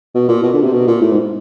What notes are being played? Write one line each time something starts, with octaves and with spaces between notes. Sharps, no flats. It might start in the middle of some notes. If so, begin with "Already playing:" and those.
B2
A#2
B2
D3
C3
B2
A#2
A2
G#2